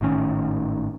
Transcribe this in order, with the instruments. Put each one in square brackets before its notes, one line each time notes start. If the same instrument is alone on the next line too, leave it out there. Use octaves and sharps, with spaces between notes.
[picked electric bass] G#1 A2 D#3 C#4